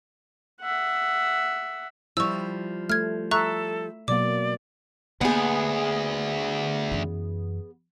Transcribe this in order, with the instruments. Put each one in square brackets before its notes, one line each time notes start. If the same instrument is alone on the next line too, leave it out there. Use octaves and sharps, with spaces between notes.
[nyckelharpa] E5 F#5
[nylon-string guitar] F3 G3 [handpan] E4 [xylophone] C#6 E6
[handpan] A3 [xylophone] F6 G#6
[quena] A4 [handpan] E5 [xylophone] A#5 C#6 F#6
[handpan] B2 F#3 A#3 [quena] D5 [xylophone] D6
[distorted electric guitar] D2 [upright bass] A#3 [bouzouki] B3 G#4
[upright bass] F#2 E3